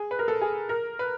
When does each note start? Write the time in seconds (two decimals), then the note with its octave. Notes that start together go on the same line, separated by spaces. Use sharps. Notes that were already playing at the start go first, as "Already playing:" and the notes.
Already playing: G#4
0.11 B4
0.19 A#4
0.28 A4
0.41 G#4
0.69 A#4
0.99 B4